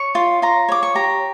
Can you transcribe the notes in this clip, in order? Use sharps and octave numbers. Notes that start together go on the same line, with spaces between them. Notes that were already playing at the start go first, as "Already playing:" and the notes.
Already playing: C#5 C#6
F4
F4 A#5
C#5 D6
C#6
G4 A#5